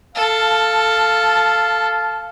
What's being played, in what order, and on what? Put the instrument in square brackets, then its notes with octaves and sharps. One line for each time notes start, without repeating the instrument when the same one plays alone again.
[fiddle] A4 [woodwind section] F5 A5